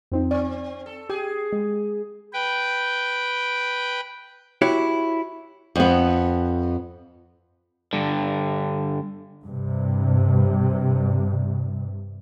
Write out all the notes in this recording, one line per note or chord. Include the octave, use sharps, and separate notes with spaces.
F2 C4 D#4
C4 D5
A4
G4 G#4
G#3
B4 G5
E4 F#4 G4 C#5
F2 B3
G2 D3
G2 C3